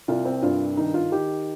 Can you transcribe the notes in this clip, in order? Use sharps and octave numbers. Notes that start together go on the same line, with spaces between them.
C2 F4
C4
G2 F4
D#3 D#4
F4
D#3 G4